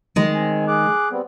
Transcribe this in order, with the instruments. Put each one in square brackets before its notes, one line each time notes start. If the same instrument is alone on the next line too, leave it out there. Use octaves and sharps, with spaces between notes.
[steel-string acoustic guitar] D#3 G#3
[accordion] C4 G#5
G#4 D6 F#6
G3 B3 C4